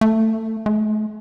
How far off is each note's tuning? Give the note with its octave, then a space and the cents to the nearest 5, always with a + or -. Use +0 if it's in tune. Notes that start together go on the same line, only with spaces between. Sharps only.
A3 +20
A3 -40